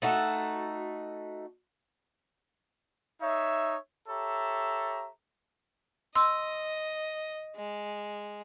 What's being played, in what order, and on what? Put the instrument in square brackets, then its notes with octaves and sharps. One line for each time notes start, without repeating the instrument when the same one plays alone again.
[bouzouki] A3 D#4 F#4 A4
[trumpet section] D#4 C#5 E5
G4 A4 C#5 E5 A#5
[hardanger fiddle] D#5 [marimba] C6 E6
[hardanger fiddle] G#3